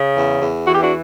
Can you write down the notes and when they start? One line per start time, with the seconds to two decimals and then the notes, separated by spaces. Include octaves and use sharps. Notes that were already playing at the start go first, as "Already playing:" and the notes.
Already playing: C#3
0.17 E2
0.41 E2
0.67 E3 F#4
0.75 G4
0.83 D4 F#4